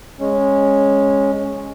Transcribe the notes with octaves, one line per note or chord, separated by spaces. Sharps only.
G#3 C#4